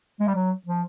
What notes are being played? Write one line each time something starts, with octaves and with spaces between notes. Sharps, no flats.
G#3
G3
F#3
F3